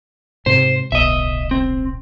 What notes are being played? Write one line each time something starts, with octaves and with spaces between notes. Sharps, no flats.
G#2 C3 C5
D1 B1 D#5 E5
C4